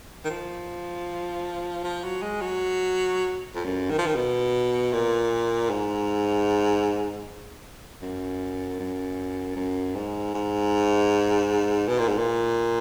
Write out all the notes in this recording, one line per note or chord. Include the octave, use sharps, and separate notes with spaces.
D#3
F3
F3
F#3
G#3
F#3
F2
F#2
D#3
F3
D#3
B2
A#2
G#2
F#2
F#2
F#2
G#2
G#2
B2
A#2
G#2
A#2